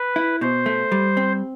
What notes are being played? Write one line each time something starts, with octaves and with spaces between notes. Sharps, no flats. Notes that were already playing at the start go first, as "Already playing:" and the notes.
Already playing: B4
E4
B2 C5
A3
G3
C4